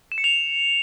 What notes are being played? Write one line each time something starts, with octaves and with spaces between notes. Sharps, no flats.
E7
C#7
F7